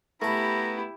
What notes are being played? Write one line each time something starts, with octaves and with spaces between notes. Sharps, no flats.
A3 B3 E4 G4 A5 A#5